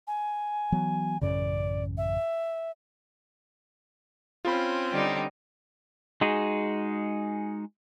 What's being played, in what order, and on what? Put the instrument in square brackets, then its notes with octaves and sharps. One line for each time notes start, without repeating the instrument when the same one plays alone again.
[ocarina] G#5
[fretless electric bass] E3 F#3 B3
[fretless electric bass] A1 F#2 C#3 [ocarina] D5
[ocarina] E5
[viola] C4 C#4 [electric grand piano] F4 B5
[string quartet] D3 G3 D#4
[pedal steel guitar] G#3 D#4 F#4 G#4